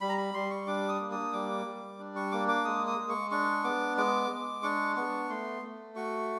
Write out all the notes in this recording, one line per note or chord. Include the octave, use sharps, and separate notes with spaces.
G3 B5
A#5
B5
G3 C6
C#6
D4 D6
D#6
A#3
D#6
G3 D6
G3
D4
C#6
A#3 D6
D6
G#3 D#6
D#6
G#3
C#6
D4 C#6
B3 D6
G#3 D6
G#3
D4 C#6
B3 C#6
A3 C6
A3
F#4 C#6